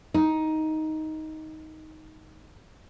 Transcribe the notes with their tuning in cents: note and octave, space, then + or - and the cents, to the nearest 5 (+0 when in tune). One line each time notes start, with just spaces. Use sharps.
D#4 +10